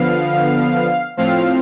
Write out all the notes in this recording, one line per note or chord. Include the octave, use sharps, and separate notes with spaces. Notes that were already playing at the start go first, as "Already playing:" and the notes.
Already playing: D3 F3 B3 F5
A2 F3 C4 F5